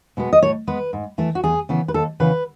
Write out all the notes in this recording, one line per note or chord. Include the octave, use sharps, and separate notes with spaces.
B2 G#3 B3
D#5
A2 C#5
G#3 B3 B4
G#2
E3 A3
F#4
E2 G#4
C#3 E3 B3
B4
D#2 A4
C#3 E3 B3 B4